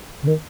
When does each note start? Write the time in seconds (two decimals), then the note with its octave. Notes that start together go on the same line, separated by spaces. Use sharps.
0.22 C#3
0.27 D#3